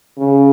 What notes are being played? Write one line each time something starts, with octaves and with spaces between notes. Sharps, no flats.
C#3